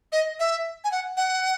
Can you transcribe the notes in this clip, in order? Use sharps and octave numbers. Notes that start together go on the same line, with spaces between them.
D#5
E5
G#5
F#5
F#5